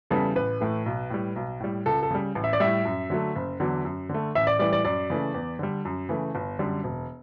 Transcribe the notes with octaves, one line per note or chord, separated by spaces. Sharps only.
E2 C#3 E3 G3 A4
A1 B4
A2 E3 A3
B1
A2 G3
B1
A2 G3
C#2 A4
A4
C#3 G3
A1
E5
D5
A2 G3 E5
F#2
D3 F#3 A3
F#1
E2 D3 F#3
F#2
D3 A3
A1 E5
D5
A2 E3 G3 D5
D5
F#2 D5
C#3 E3 A3
E2
D3 G3
F#2
C#3 E3 A3
G1
F#2 D3 G3
E1